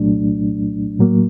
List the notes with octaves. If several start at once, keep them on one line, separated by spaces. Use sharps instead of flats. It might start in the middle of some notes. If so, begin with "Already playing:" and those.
Already playing: C2 A#2 F#3 A3 D4
A2 F#3 A#3